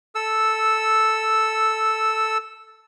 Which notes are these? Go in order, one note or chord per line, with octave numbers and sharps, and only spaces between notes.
A4 E6